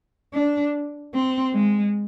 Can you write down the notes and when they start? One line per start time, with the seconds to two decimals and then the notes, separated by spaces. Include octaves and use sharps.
0.33 D4
1.14 C4
1.54 G#3